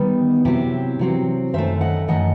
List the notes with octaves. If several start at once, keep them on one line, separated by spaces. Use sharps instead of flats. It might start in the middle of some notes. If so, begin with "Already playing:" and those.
Already playing: D#3 G3 B3 D#4
C3 F#3 C4 E4 G4
C3 F#3 C4
F#2 D#3 A3 C5 E5
D#5 F#5
F#2 D#3 A3 D#5 F#5